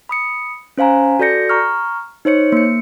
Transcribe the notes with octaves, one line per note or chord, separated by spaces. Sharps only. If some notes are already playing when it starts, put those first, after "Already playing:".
B5 D#6 C#7
C#4 C5 F5 G#5 A#5
F#4 A4 D5 G6 A#6 C#7
A#5 C#6 F6
D#4 C5 C#5 C#7
A#3 C#7